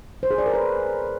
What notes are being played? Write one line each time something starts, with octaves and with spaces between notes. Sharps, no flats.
C5
G#4
D5
A#4
B4